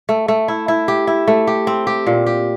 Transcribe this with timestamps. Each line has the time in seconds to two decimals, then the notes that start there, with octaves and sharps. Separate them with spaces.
0.09 A3
0.28 A3
0.48 E4
0.68 E4
0.88 G4
1.07 E4
1.27 A3
1.47 G4
1.67 C4
1.87 G4
2.07 A#2
2.26 G4